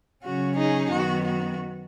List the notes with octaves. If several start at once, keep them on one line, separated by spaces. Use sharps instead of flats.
C#3 F#3 C#4 F#4
D#4 G#4
F#2 D#3 B3 F#4
F#4